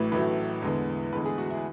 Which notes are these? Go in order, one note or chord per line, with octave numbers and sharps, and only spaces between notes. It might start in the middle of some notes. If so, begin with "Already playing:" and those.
Already playing: A1 A2 F#3 A3 B4
A1 A2 F#3 A3 B4
E2 D3 G#3 B3
E2 D3 G#3 B3 B4
G#4
F#4
E4